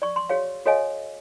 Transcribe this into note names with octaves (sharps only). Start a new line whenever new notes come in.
D5 C#6
C6
F#4 G#4 C#5 F5
F#4 A4 C#5 D#5 F5 G#5